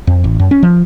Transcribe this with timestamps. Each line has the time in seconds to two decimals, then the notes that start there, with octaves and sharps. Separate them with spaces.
0.07 F2
0.24 A1
0.40 F#2
0.51 C#4
0.63 F3